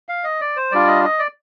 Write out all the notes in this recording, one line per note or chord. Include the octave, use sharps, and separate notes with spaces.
F5
D#5
D5
C5
G3 D4 F4 D5
D#5
D#5
D5